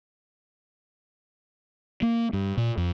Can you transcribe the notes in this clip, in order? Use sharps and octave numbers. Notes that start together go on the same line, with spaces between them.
A#3
G2
A#2
F2